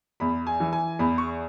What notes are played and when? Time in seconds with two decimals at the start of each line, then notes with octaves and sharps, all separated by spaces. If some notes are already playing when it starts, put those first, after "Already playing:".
0.20 E2 B5
0.47 G#5
0.60 E3
0.73 G#5
0.99 E2 B5
1.18 C#6